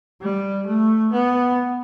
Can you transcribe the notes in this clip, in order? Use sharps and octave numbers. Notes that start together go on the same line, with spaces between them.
G3
A3
B3